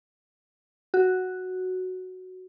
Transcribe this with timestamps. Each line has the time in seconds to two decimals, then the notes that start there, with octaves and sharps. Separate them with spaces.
0.94 F#4